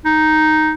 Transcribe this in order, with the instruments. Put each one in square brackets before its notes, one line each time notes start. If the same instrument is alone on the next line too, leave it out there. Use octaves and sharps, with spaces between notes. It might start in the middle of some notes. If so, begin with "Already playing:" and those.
[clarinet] D#4